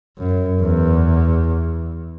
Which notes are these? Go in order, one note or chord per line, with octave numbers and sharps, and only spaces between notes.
F#2
E2